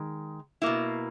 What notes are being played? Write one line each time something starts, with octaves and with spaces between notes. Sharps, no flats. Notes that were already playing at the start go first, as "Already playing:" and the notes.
Already playing: D#3 G#3
B2 A#3 E4